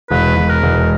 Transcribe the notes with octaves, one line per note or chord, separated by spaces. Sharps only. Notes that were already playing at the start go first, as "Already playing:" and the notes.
E1 B4
E1
A#4
E1